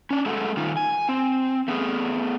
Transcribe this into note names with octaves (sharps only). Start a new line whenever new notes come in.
C#4 D4
G#3 A3 F#4 G#4 A4
D#3 D#4 F4
G#5
C4
A3 B3 G#4